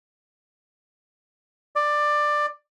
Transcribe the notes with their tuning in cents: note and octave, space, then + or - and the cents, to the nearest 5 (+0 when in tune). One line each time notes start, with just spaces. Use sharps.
D5 +15